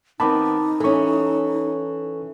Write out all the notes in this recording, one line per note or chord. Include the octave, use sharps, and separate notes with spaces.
D#3 B3 C4 D#4 A5 B5 D6
E3 C#4 A4 C#6